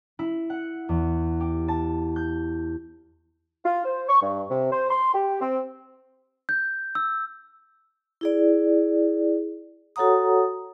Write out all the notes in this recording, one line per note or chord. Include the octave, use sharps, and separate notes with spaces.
E4
F#5
E2
G4
A5
G6
F4
C5
C#6
G2
C3
C5
C6
G4
C4
G6
E6
E4 G#4 D5
F#4 A4 C#5 F#5 A#5 D#6